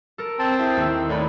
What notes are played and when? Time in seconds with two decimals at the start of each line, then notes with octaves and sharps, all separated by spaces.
0.18 A4 A#4
0.39 C4 A5
0.59 E4 G#4 E5
0.74 D#2 E6
1.09 A2 D#4 D5 B5